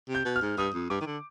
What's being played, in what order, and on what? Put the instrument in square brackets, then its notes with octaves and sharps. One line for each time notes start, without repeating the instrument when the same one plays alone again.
[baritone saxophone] C3
[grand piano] G6
[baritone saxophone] B2
[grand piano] F6
[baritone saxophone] G#2
[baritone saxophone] G2 [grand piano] D#6
[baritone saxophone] F2
[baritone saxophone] G2 [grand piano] D6
[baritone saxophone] D#3
D3